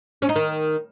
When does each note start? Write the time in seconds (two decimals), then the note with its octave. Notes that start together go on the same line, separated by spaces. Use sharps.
0.22 C#4
0.29 D#4
0.36 D#3